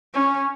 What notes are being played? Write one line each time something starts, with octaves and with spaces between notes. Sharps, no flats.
C#4